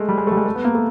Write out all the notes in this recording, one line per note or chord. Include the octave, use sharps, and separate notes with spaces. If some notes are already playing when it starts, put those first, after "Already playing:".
Already playing: G#3 A3
G3
G#3
A3
G3
G#3
A3
B3
A#3
A3